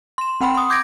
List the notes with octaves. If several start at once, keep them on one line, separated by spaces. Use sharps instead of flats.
C6 E7
C4 F#5 G5 B5 C6
C6 D#6
D6 G6 G#6 A#6 D7